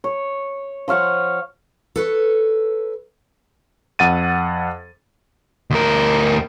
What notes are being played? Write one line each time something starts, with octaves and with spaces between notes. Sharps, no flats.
C#5
F3 C#5 F5 F#5
A4 B4 C#5
F2 F#5 A6 D#7
D2 A#4